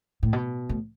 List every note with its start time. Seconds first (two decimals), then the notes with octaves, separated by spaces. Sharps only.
0.23 A2
0.33 B2
0.69 A2